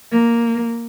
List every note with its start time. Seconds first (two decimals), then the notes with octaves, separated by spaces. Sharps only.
0.12 A#3